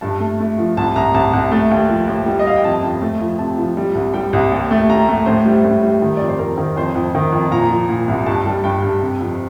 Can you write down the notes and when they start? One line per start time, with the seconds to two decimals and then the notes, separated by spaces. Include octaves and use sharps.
0.01 G2 A5
0.20 A3
0.40 A3
0.58 F3
0.77 C2 A5
0.96 C2 A#5
1.14 C2 A5
1.33 C2
1.51 A3
1.71 D#2
1.89 F3
2.08 D#2
2.26 G3
2.39 D#5
2.46 G3 F5
2.56 G5
2.64 F2 A5
2.83 F2
3.02 A3
3.21 F3
3.39 C3 A5
3.58 F3
3.77 G3
3.95 C2
4.14 G3 G5
4.33 C2
4.52 D#2
4.71 A3
4.89 D#2 A#5
5.09 A3
5.26 A2 C5
5.46 G3
5.64 A2
5.83 G3
6.02 D#3
6.17 F2 D5
6.28 C5
6.39 F2 A#4
6.57 D#3 A#4
6.76 F2 C5
6.95 F2
7.15 D#3
7.32 F2
7.51 A#2 A#5
7.70 F3
7.89 A#2
8.08 C2
8.26 G2 A5
8.46 G3
8.64 G2 G5
8.82 G2
9.02 C3
9.21 F2